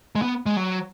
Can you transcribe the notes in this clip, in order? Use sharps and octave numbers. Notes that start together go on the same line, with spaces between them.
G#3
B3
G#3
F#3